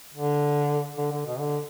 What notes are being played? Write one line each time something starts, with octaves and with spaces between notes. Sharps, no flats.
D3
D3
D3
B2
D3